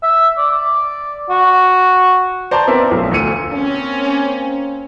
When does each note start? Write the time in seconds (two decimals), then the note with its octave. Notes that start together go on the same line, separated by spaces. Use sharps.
0.03 E5
0.38 D5
1.29 F#4
2.51 C5 D5 A5 A#5
2.67 B3 C4 E4 A#4 D5 E5
2.91 B1 A2
3.12 D2 F4 E6 C#7 D#7
3.52 A#3 C4 C#4